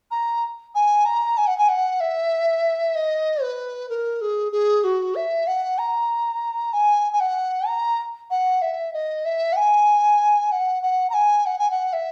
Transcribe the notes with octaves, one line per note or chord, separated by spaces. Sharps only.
A#5
G#5
A#5
G#5
F#5
G#5
F#5
E5
D#5
B4
A#4
G#4
G#4
F#4
E5
F#5
A#5
G#5
G#5
F#5
A#5
F#5
E5
D#5
E5
F#5
G#5
F#5
F#5
A#5
G#5
F#5
G#5
F#5
E5